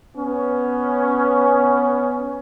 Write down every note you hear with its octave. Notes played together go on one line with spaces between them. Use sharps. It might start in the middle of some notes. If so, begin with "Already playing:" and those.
B3 C#4